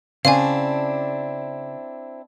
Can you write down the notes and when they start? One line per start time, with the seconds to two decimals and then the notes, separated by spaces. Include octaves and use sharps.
0.25 C#3 C4 D4 E4 F5 G#5